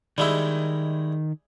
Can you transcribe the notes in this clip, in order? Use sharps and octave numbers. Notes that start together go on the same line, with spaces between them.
D#3 G3 G#3 E4